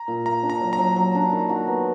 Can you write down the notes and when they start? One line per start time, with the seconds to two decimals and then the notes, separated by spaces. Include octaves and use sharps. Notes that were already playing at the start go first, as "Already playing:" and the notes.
Already playing: A#5
0.08 A#2
0.26 A#3 A#5
0.43 D4
0.50 A#5
0.61 F#3
0.73 A#5
0.78 F#3
0.96 F#3
1.15 D4
1.33 D#3
1.49 F#4
1.68 B3